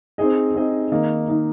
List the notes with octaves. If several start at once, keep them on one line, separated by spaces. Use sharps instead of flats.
C4 D#4 G#4 D#5
C4 D#4 G#4 D#5
D#3 A#3 D#4
D#3 A#3 D#4